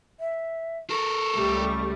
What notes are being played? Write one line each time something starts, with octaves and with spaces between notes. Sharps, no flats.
E5
A4 A#4 C#6
C#2 G3 A3